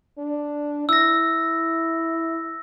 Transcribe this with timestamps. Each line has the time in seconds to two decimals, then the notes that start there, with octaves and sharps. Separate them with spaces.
0.18 D4
0.89 E4 E6 A#6